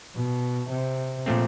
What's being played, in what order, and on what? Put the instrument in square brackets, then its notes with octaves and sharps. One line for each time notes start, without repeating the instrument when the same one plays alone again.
[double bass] B2
C3
[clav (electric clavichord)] A#2 F3 A3 C4